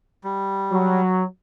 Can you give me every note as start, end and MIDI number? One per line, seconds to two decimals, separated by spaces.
0.24 1.02 55
0.72 1.24 54